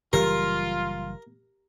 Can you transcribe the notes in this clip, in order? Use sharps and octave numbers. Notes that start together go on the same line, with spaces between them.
F#1 E3 G3 F4 G4 A#4